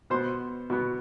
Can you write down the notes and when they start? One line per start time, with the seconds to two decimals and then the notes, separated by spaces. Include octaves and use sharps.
0.10 B2 B3 C5
0.70 B2 B3